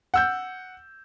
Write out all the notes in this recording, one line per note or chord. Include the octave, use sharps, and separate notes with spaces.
F#5 E6 G6